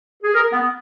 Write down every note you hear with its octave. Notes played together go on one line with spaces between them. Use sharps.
G#4
A#4
B3